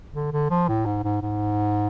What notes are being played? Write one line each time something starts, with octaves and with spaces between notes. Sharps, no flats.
D3
D3
F3
A2
G#2
G#2
G#2